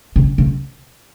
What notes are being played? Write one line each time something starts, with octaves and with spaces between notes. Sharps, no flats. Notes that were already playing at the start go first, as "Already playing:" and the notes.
C#3
C#3